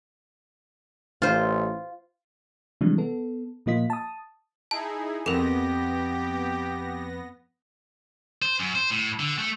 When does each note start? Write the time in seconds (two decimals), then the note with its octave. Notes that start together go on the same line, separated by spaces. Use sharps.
1.22 A1 F4 C5
2.81 C3 E3 F3 G3 G#3 D4
2.98 B3 A4
3.66 A#2 F3 A#3 F4 D#5 B6
3.90 A5 D#6
4.71 D#4 E4 G#4 A5
5.26 F2 B3 G4 A4 A#4 A#6
8.42 C5
8.60 F#2
8.75 C5
8.91 A2
9.19 D3
9.39 A3